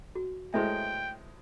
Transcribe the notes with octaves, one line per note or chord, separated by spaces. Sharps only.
F#4
A2 G#3 B4 C5 E5 G5